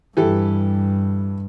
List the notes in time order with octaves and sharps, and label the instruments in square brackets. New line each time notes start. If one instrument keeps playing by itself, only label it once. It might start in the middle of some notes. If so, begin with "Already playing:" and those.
[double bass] G2 [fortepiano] E3 G4 A4